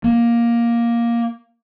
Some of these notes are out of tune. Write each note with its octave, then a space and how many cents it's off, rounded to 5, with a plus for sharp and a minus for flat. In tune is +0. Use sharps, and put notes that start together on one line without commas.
A#3 +10